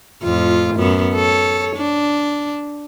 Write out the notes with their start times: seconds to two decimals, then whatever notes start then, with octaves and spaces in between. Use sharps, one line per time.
0.23 F2 A2 F4
0.76 F#2 B3
1.15 A4 C#5
1.76 D4